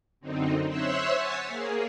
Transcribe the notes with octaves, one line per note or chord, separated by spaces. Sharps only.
F#2 D3 C4 D#4
C5 C#5 E5 C6 E6 F#6
C#5 F#5 G#5 A6 B6 C7
A#3 G#4